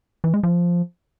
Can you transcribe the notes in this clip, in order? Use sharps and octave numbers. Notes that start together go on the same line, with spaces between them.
E3
G#3
F3